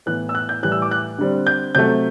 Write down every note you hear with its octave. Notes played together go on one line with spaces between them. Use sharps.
A2 E3 B3 F#6
E6
F#6
G6
A2 E3 G3 F#6
E6
D6
F#6
D3 G3 C4
G6
C3 F#3 A3 G6